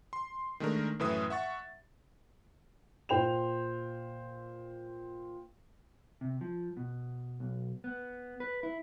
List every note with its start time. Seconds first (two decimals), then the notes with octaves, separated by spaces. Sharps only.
0.13 C6
0.60 D#3 G#3 A3 D4 A#4
0.99 F#2 A2 E3 B4 E5 D#6
1.30 E5 F#5 C#6 A6
3.09 A#2 C5 G5 C6 F7
6.21 C3
6.41 F3
6.77 B2
7.40 B1
7.84 B3
8.40 B4
8.63 E4